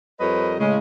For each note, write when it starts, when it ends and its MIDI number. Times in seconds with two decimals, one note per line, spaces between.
0.20 0.55 41
0.20 0.55 55
0.20 0.55 70
0.20 0.55 71
0.20 0.55 73
0.20 0.55 75
0.60 0.78 45
0.60 0.78 49
0.60 0.78 56